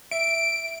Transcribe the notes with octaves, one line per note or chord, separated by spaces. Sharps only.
E5 D7